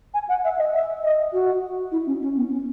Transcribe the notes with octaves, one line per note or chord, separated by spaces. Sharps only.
G#5
F#5
E5
D#5
E5
D#5
F#4
E4
C#4
C#4
B3
C#4